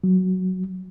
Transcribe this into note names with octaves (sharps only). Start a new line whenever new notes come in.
F#3